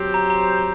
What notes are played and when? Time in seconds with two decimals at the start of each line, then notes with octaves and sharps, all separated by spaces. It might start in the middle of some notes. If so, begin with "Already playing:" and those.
Already playing: F#3 C4 G4 C5
0.14 A#5
0.30 A#5